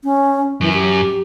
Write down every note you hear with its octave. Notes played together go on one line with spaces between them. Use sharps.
C#4
F#2 E3
G4